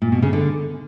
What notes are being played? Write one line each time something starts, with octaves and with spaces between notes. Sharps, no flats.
A#2
B2
C#3
D3